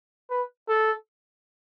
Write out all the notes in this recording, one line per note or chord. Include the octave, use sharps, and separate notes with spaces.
B4
A4